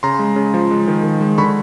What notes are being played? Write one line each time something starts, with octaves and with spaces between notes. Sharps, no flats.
C#3 A#5 C6
G#3
C#3
F3
G#3
D#3
D#3
G#3
D3 B5 C#6